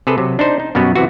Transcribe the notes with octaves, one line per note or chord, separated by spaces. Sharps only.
C3 G#4 A4 B4
C3 F#3
D4 D#4 C5
D#4
F#2 B2 G3 B3 F#4 B4
C3 E3 F#4